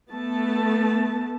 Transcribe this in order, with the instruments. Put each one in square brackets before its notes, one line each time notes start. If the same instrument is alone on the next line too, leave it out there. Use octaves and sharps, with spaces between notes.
[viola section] A3 B3 A5